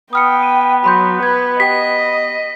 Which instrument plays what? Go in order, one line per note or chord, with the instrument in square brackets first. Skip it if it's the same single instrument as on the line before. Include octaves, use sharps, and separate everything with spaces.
[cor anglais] B3 [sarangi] G5 [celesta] D#6 F6 C#7
[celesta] D#7
[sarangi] F#3 [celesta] B5 C6 G6
[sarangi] B4 [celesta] G#6
[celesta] G4 G5 [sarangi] D#5 [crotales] B6